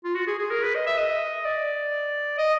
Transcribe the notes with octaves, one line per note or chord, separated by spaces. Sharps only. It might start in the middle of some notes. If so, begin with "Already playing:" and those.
F4
F#4
G#4
G#4
A#4
B4
D#5
E5
D#5
D5
D#5